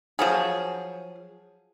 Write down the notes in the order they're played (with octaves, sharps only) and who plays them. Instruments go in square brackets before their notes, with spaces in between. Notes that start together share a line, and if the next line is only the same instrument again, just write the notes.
[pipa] F3 F#3 G#4